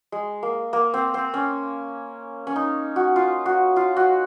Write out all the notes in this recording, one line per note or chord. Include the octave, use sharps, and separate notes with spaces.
G#3
A#3
A#3
C4
C4
C#4
C#4
D#4
F#4
F4
F#4
F4
F#4